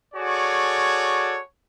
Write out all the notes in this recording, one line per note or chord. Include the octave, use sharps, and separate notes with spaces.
F#4 G#4 A4 C#5 D5